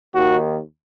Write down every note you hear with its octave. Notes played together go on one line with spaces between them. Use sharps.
D#2 D#3 F#4